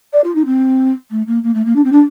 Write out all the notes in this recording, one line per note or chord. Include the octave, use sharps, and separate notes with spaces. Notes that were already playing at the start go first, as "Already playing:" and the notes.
D5
F4
D#4
C4
A3
A#3
A#3
A3
A#3
D4
C4
D4